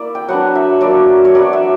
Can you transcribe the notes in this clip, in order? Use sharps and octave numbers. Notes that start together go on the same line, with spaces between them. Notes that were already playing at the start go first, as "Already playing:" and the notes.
Already playing: A#3 E4 D5
G5
F#3 B3 D4 F#5
E5
F#3 A#3 E4 D5
C#5
F#3 B3 D4 D5
E5